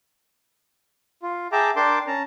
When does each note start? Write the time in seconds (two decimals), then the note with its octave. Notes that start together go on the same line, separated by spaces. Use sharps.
1.23 F4
1.52 G#4 E5 G5 A5 A#5 D6
1.76 D4 A#4 G5 A5 C6 D6
2.07 C#4 A5 A#5